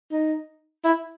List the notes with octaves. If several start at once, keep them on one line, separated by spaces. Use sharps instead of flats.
D#4
E4